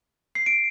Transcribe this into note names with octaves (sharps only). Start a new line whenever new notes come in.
C7
D7